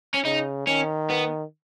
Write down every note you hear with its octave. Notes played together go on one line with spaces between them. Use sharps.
C#4
C#3 D#4
D#3 C#4
B3